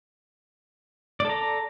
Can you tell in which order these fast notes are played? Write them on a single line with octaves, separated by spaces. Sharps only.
D5 A4 A#5